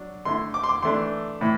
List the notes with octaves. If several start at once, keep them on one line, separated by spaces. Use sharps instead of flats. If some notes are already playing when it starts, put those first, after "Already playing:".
Already playing: F#3 D4
D3 A3 E4 C6
D6
C6
D6
E3 A3 D4 C6
A2 E3